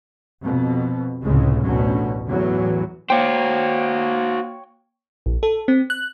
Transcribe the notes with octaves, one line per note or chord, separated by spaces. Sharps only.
F2 B2
F1 C#2 A2 C#3 G#3
A1 D2 B2 F#3 C#4
E2 A2 E3 F#3
A#3 F#4 C5 C#5 G5
A#1
A4
C4
F#6